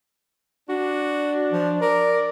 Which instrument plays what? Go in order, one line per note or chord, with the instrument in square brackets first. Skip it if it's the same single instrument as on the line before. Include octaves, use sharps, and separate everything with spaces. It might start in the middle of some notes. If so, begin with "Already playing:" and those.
[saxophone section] D4 [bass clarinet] F#4
[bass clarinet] F3
[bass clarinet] A#4 [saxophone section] D5